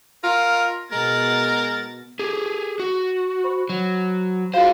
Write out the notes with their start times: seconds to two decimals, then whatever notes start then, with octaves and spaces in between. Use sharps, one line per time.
0.24 F4 A#4
0.92 B2 G#3 A#4 A6
2.19 G4 G#4
2.80 F#4
3.44 C5 B5 C#6
3.69 F#3
4.54 F4 F#4 G#4 C5 F5